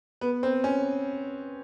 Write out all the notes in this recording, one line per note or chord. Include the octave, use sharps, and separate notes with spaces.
B3
C4
C#4